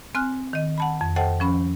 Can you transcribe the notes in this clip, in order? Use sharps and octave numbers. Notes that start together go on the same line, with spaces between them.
C4 G#5 F6 F#6
D#3 D#5
F#5 A5 B5
F2
A4 C5 D#5 F#5 G5 A5
F3 C#4 B5